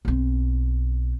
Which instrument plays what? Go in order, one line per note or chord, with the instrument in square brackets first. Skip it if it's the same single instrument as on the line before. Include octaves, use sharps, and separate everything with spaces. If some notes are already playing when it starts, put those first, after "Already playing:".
[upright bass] B1 C4